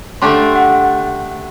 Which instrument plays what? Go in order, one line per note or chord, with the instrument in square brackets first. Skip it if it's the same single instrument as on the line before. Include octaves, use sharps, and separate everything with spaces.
[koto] D3 A3 D4 G4 [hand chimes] C6
[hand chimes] F#5